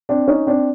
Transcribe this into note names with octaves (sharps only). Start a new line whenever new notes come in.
C4 D4
C#4 D#4
C4 D4